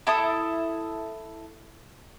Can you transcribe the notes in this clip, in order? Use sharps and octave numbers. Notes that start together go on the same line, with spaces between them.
E4 A4 E5 D#6